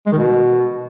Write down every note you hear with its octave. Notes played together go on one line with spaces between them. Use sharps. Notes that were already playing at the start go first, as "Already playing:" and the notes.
G#3
D#3
B2